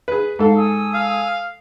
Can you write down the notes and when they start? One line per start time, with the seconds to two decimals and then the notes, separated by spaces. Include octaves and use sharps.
0.08 G#4 B4
0.39 G#2 A4 F5
0.55 G#5 D#6 E6
0.94 F5